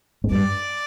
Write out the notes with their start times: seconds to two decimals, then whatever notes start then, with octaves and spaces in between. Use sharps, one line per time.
0.24 G#2
0.32 G2 D5